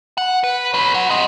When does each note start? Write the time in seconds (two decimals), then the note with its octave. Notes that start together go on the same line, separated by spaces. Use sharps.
0.18 F#5
0.44 B4
0.74 B4 C#5
0.94 C#5 F#5
1.10 C4 D#5